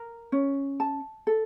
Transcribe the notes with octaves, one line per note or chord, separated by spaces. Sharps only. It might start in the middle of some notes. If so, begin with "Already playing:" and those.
Already playing: A#4
C#4
A5
A4